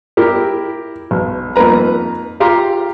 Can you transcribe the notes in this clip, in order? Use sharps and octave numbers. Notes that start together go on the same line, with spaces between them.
E4 G4 A#4
B1
F2 A#3 D#4 B4 A#5
F4 G4 F5 A#5 C6